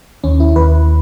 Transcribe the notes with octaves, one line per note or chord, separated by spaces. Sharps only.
D#2 C#4
E4
D#2 B4